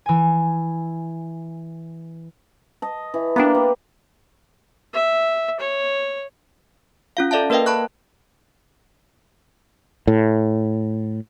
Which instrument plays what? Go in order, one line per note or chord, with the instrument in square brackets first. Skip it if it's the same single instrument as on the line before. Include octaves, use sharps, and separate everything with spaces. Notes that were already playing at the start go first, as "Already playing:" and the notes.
[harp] E3 G#5
[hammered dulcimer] D#5 A5
E3
[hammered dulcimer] A#3 G4 [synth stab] B3 D4
[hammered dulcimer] B4
[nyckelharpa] E5
C#5
[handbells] C#4 F4 F5
A4 D5 E5 F5 A5
A#3 A#4 B4 D#5 F5 G5
A5 B5 C#6 F#6
[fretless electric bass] A2